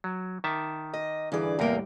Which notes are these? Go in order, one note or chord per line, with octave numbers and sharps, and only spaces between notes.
F#3
D#3 E5 A5 D6
D#5
G2 D3 E3 G#4 D5
E2 A2 C3 G3 A#3 A#4 G5